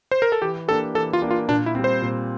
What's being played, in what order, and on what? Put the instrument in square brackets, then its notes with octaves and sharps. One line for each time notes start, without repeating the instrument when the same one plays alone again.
[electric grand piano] C5
A#4
A4
[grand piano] E3 [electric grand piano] G4
[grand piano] A#3 D4 G4 [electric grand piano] A4
[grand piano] E3 [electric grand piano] A4
[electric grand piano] F4
[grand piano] A#3 D4 G4
[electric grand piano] F4
[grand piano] A#2 [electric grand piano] D4
[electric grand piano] E4
[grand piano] G3 C4
[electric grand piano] C5
[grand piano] A#2